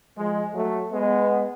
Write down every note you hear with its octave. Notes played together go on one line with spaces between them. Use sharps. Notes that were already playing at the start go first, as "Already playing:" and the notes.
F3 G#3
F#3 A3
G#3 B3